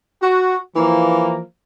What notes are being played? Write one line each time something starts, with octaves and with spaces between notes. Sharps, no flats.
F#4
E3 F3 A#3